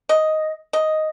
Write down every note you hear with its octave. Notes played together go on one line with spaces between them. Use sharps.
D#5
D#5